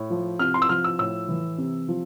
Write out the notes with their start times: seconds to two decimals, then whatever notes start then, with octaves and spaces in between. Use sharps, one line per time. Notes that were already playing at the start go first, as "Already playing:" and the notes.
Already playing: A2
0.10 F3
0.39 C3 F6
0.54 C6
0.62 E6
0.69 F3 F6
0.84 E6
0.99 A2 E6
1.29 E3
1.58 C3
1.88 F3